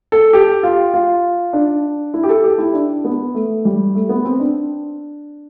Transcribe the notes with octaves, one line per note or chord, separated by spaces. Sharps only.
A4
G4
F4
F4
D4
E4
G4
A4
G4
E4
D4
B3
A3
G3
A3
B3
C4
D4